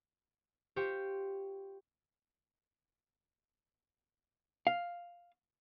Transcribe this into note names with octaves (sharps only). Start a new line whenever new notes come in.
F4 G4 C5 G5 C#6
F5